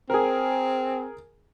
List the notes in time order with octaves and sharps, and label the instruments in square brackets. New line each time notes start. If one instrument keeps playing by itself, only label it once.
[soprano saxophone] C4 [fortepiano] G#4 A#4